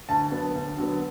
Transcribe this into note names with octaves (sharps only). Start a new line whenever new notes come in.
D2 A5
D3 F#3 B3
D2
D3 F#3 B3